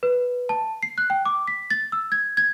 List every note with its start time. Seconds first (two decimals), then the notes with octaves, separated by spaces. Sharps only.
0.03 B4
0.49 A5
0.83 C7
0.98 F#6
1.10 G5
1.25 D6
1.48 B6
1.70 A6
1.92 E6
2.12 G#6
2.37 G#6